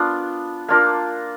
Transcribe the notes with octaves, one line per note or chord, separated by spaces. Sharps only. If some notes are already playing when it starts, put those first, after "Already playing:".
Already playing: B3 D4 F4
A#3 D4 F4 A#4